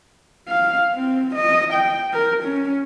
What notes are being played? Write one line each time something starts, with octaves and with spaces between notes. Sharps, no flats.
F5
C4
D#5
G5
A#4
C#4